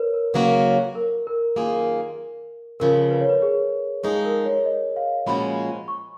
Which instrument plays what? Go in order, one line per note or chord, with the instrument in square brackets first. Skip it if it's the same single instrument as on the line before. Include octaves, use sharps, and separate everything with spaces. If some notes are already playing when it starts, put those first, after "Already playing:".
Already playing: [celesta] A#4 B4 C#5
A#4
[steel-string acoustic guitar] C#3 F#3 A#3 C#4 F#4 [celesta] B4
[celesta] A#4
A#4
[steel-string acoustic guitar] F#2 D#3 A#3 F4 G#4
[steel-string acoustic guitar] F2 C#3 F3 [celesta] A#4
[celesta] B4
C#5
B4
G#4
[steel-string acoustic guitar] F3 G#3 D#4 [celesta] G#4
[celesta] A#4
C#5
D#5
F5
[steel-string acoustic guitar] A#2 F3 G#3 C#4 F#4 [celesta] B5
[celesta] C#6